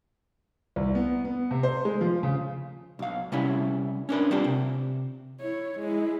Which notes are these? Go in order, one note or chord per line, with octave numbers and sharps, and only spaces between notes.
C2
B3
B3
C3
C5
G#3
F3
C#3
B1 F5
C3 G3 C#4 E4
C#4 D4 A#4 B4
G3 C4 D4 F4 G4
C3
E4 C#5
G#3 E4